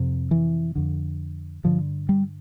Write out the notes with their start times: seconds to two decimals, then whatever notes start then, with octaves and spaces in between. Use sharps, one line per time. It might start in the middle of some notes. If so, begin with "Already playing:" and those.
Already playing: F2 C3
0.31 E3
0.75 F2 D3
1.64 G2 D3 F3
2.09 G3